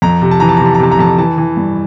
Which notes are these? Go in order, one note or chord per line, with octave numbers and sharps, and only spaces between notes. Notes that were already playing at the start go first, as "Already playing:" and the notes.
F2 A#5
C3
A5
E3 A#5
A5
C3 A#5
A5
A#5
C3 A5
A#5
F2 A5
E3 A5
E3
G2